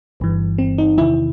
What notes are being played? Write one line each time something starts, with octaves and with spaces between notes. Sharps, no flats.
G1 G2 E3
C4
D#4
E2 C3 D#3 E4